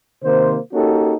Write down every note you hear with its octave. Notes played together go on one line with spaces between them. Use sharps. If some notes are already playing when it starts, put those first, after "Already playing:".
C3 D#3 A#3 C5
A#3 C#4 D#4 F#4 G4 A4